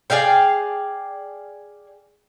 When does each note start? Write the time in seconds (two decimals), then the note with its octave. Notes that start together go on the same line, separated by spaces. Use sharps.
0.10 G#4 D5 F5 G5